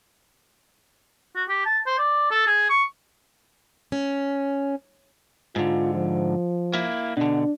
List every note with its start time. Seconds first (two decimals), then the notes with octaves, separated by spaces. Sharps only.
1.36 F#4
1.49 G4
1.65 A5
1.86 C5
1.98 D5
2.31 A4
2.47 G#4
2.70 C#6
3.92 C#4
5.56 G#2 D3 F4
5.95 F3
6.74 A#3 E4
7.17 B2 D3 D4